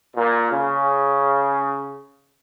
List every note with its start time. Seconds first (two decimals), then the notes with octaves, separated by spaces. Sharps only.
0.16 A#2
0.51 C#3